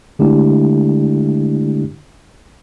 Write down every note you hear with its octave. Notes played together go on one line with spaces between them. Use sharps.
D3 G#3 A3 D4 E4 G4